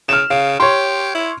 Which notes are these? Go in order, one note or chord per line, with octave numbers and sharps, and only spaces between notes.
C#3 F6 E7
C#3 F5
G4 C#5 C6
E4